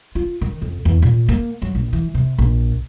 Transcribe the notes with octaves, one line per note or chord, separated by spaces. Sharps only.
F4
D#3
F2
E2
A#2
A#3
F#3
A#1
E3
C3
A#1